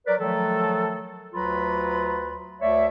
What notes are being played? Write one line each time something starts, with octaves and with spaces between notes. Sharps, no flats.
F#3 A#4 B4 D5
D#3 F3 F#3 A3 A4
D2 F#3 F4 B4 A#5 B5
D2 A3 C#5 D5 E5